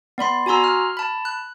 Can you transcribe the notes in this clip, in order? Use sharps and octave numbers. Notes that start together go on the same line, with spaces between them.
B3 D5 B5 C6
F#4 G#5 A#5 C6 E6
F6
A5 B5
F#6